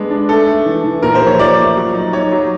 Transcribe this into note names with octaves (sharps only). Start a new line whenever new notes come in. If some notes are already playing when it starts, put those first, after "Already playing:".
Already playing: G#3 B3 D4
D4
A3 A4
A3
E3
E3
A#2 A#4
C5
F3
C#5
F3 D5
A3
F#3
D#4
D#4 C#5
F#3